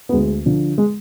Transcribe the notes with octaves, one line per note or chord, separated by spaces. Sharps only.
B3
D2 G#3
D3 F3
G#3